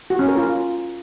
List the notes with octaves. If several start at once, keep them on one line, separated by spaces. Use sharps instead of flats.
F#4
C#4
A#4
F4